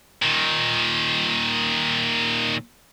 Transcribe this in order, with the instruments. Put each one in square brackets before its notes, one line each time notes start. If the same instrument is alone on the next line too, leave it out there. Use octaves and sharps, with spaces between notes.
[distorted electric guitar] A#2 D#3